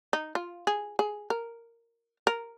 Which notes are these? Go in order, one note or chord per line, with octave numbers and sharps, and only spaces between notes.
D#4
F4
G#4
G#4
A#4
A#4